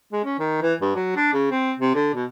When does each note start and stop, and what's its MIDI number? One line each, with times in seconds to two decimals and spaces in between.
0.13 0.22 56
0.25 0.39 61
0.39 0.62 51
0.62 0.74 52
0.81 0.90 43
0.95 1.12 54
1.16 1.32 62
1.34 1.49 49
1.51 1.74 60
1.79 1.94 48
1.95 2.14 50
2.14 2.25 47